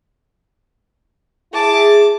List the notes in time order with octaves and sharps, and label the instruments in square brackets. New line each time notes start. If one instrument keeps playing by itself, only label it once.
[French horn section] E4 G#4 [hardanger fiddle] A5 D6